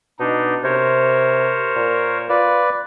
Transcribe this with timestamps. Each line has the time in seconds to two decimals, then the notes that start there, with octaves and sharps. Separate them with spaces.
0.19 B2 D4 D#4
0.64 C3 A#4 C5 C#5
1.76 A#2
2.29 F4 B4 D5